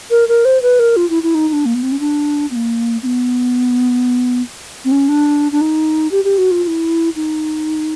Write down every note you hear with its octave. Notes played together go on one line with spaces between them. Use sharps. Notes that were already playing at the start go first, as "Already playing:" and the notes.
A#4
A#4
C5
B4
A#4
F4
E4
E4
D#4
D#4
D4
A#3
B3
C4
C#4
D4
B3
A#3
C4
B3
C4
C#4
D4
D4
D#4
G4
G4
F#4
F4
F4
E4
D#4